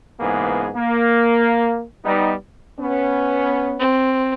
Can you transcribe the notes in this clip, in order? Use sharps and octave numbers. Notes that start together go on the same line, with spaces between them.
C#2 G#2 E3 A#3 B3 G#4
A#3
G3 B3 D#4
B3 C#4
C4